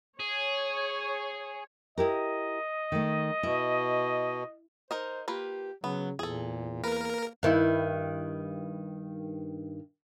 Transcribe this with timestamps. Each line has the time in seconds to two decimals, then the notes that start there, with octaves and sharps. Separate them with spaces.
0.20 G#4 C#5
1.98 E4 G4 A#4 D#5
2.92 D#3 A3
3.43 B2 E4
4.91 D#4 A#4 C5 D#5
5.28 A#3 F4 G4 B4
5.84 C#3 F#3 B3
6.19 E2 A#2 G#4 A4
6.84 A#3 A#4 B4
7.43 G2 D#3 E4